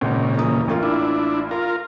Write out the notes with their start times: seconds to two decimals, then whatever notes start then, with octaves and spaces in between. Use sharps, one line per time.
0.01 G#1 A#2 C#3
0.38 D#1 E3 D#6
0.68 A1 A#3 F4
0.83 D4 E4
1.51 F4 A#4